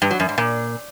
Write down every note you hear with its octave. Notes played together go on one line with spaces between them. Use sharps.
G2
F#3
F#2
G#2
A#2